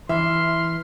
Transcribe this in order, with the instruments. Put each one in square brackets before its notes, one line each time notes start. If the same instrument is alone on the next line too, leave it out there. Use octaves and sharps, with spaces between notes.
[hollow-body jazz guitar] E3 [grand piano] E5 [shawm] C6 [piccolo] F6